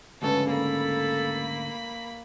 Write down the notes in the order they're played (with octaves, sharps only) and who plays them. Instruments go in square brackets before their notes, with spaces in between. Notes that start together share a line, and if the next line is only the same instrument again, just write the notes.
[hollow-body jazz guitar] D2 G#2 C#3 [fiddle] A4 B4
[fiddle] A#3 B5 [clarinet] A4